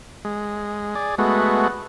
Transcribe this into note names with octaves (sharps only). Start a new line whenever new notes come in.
G#3
G#4 D5
G#3 A3 B3 F#4